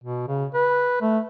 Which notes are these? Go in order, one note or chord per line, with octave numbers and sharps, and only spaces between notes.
B2
C#3
B4
A3